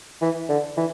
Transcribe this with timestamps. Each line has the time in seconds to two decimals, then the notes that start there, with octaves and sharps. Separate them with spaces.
0.21 E3
0.49 D3
0.77 E3